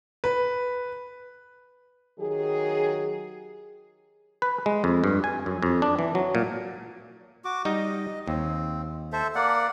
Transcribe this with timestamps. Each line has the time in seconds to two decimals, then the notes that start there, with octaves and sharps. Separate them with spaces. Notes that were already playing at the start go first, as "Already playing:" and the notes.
0.24 B4
2.19 D#3 F#3 G4 G#4
4.42 B4
4.66 G#3
4.84 F2
5.04 G2
5.24 G#5
5.46 F#2
5.63 F2
5.82 D4
5.99 E3
6.15 F#3
6.35 A#2
7.45 F#4 D6
7.65 G3 D#4 D#5
8.27 D#2 C4
9.12 A4 C5 E5
9.35 A#3 D5 F#5